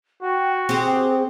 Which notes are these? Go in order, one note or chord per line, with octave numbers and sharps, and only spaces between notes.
F#4 G5
C4 G4 G#4